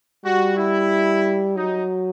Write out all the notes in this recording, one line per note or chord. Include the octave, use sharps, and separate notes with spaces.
G3 F#4
E4
F#3 D#4